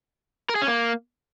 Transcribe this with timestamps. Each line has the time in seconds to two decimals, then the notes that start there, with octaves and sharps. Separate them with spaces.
0.49 A#4
0.56 G#4
0.62 C#4
0.68 A#3